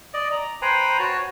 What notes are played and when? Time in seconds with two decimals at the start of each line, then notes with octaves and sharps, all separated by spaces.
0.14 D5 D#5
0.32 A#5
0.62 B4 C5 G5 G#5 A#5 B5
0.99 F#4 C#5 A5